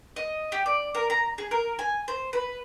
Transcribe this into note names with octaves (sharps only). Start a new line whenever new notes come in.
D#5
G4
D5
A#4
A#5
G#4
A#4
G#5
C5
B4